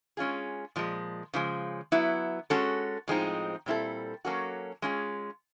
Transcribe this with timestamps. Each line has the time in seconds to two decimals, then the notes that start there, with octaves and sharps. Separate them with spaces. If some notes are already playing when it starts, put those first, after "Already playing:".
0.17 G#3 C#4 F4 G#4
0.76 A#2 F3 G#3
1.33 C#3 F3 G#3
1.92 F#3 B3 E4
2.50 G#3 C#4 F#4 A4
3.08 A2 F3 G#3 C4 D#4
3.66 A#2 G3 C4 E4 A4
4.25 F#3 A#3 C#4 F#4 A4
4.82 G#3 C#4 F4 G#4